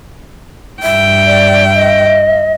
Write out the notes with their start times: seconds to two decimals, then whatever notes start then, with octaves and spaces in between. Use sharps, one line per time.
0.83 G2 E5 G5
1.27 D5
1.75 D#5